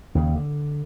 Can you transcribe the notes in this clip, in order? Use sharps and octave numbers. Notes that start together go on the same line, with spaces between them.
D#2 C#3
D3